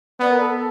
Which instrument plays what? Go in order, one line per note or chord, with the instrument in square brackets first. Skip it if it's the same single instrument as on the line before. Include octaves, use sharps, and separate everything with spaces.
[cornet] B3 [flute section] D5
[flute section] A#4
A4
A4